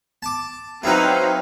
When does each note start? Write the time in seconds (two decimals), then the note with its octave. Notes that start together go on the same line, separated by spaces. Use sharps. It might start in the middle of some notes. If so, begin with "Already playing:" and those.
0.23 A5 D6
0.83 F#3 C4 D#4 E4 B4 F5